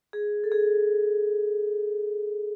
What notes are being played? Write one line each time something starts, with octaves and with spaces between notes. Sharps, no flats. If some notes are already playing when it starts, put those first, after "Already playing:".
G#4
A4
G#4